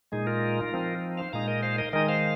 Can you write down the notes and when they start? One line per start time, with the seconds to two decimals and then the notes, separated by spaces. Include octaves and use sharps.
0.12 A#2 G#3 D#4 G#4
0.27 F4 A#4
0.73 F3 C4 D#4
1.17 C5 F5
1.33 A#2 G#3 D#4 F5 A#5
1.48 A#4 D#5
1.63 C5 F5
1.78 A#4 D#5
1.93 D#3 G#3 D#4 A#4 D#5
2.09 C5 F5